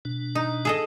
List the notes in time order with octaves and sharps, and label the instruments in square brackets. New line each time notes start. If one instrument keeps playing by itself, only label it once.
[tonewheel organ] B2 D4
[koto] D#4
G#4 A4 D#5